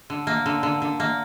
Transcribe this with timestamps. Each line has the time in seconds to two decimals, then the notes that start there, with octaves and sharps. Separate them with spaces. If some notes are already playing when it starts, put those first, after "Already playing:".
0.10 D3
0.27 A#3
0.46 D3
0.63 D3
0.82 D3
1.00 A#3